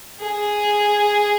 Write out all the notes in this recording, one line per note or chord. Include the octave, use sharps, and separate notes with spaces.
G#4